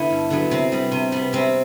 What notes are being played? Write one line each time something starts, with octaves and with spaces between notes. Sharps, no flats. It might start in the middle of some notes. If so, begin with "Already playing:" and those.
Already playing: D3 B3 E4
G2
D3 F#3 B3
C3 C4
G3 B3
C3
G3 B3
C3 C4